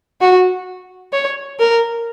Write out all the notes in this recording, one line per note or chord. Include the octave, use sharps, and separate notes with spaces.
F#4
C#5
A#4